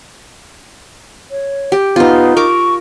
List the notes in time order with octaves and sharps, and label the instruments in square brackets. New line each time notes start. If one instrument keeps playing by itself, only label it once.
[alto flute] C#5
[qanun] G4
[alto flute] B3 [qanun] D#4 F4
[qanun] A#4 D6 [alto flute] C#6